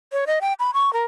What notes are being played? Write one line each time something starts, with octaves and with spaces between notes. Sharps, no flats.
C#5
D#5
G5
B5
C#6
A#4